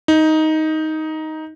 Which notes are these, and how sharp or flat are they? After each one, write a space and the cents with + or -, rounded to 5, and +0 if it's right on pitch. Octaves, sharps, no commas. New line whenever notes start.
D#4 +10